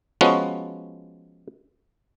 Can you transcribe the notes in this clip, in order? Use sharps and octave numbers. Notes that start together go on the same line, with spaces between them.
F3 G#3 B3 C#4 F#4